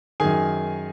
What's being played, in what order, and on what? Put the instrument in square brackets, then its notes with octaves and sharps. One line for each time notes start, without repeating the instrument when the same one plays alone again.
[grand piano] F#2 D#3 G#4 G#5